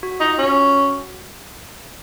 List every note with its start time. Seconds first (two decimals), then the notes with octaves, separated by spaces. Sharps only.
0.03 F#4
0.20 D#4 F4
0.39 C#4 F#4